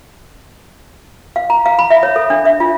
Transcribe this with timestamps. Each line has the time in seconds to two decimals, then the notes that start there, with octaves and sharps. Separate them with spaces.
1.36 F5
1.50 A#5
1.66 F5
1.79 B5
1.90 E5
2.03 C#5
2.16 A4
2.30 D4
2.45 E5
2.60 F4